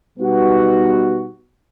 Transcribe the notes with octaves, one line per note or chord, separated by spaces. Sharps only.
B2 G3 B3 D#4 F#4